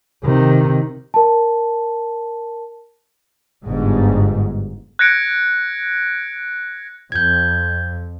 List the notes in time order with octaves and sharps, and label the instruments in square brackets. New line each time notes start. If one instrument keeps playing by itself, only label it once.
[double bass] C3 D#3
[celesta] A#4 A5
[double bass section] G1 G#2
[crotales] F#6 G#6 A#6 C#7 D7
[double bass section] F2 [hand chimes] G6 G#6